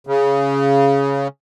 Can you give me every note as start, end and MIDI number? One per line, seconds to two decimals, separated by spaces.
0.07 1.28 49